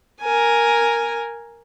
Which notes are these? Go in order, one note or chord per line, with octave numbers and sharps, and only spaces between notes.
A#4 G#5